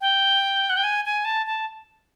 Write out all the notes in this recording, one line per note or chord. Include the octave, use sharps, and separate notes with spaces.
G5
F#5
G5
G#5
G#5
A5
A5